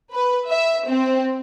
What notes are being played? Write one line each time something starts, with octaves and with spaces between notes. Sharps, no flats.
B4
E5
C4